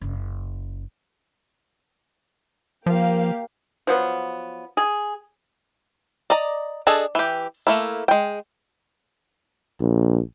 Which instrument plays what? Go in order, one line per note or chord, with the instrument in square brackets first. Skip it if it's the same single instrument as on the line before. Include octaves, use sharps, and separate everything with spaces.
[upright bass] F#1 C#3
[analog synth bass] F3 [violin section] A#3 G4 F5
[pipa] F3 F#3 B3
G#4
[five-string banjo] D5 D#5 A#5
D4 G#4 A4 D#5
E3 G4
A3 A#3 E4
G#3 G5
[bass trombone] A#1